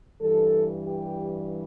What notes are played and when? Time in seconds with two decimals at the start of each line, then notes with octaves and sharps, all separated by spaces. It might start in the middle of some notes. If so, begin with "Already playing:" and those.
0.21 G2 E3 G3 A4
0.85 G4